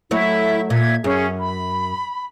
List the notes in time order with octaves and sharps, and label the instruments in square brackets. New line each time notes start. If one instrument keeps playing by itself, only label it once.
[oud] F#3 A3 C#5 [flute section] E4 E5
[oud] A#2 [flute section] E5 G#6
[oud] F#2 [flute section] C#4 G#4
[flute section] B5